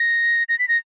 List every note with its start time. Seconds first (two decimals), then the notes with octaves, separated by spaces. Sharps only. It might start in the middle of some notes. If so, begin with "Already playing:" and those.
Already playing: A#6
0.49 A#6
0.59 B6
0.68 A#6